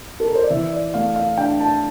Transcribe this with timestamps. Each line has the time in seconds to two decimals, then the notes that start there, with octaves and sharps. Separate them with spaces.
0.20 A4
0.27 A#4
0.35 C5
0.43 D5
0.50 E3 E5
0.72 D5
0.94 A3 F5
1.16 F5
1.38 D4 G5
1.60 A5